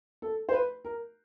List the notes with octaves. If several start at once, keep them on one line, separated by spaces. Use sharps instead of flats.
A4
C5
B4
A#4